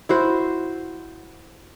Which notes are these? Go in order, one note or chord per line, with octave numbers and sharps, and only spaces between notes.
E4 F#4 C5